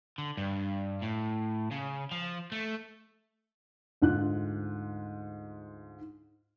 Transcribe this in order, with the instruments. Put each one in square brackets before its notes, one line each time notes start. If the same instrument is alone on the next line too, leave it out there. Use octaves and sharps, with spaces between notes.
[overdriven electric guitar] D3
G2
A2
C#3
F3
A3
[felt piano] D2 G#2 F4 F#6